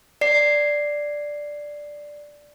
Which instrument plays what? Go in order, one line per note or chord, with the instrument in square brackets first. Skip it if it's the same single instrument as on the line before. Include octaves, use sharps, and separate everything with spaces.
[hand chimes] D5 C7